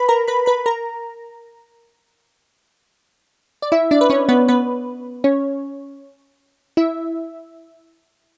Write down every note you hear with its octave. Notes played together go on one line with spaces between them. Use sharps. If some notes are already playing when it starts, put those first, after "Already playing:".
Already playing: B4 B5
A#4 A#5
B4 B5
B4 B5
A#4 A#5
D5
E4 E5
D4 D5
B4
C#4 C#5
B3 B4
B3 B4
C#4 C#5
E4 E5